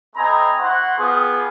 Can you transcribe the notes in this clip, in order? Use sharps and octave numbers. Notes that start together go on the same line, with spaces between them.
A3 C4 D#5 G#5 A#5 B5
E4 F#4 C5 F#5 C6
B3 F4 G4 G#4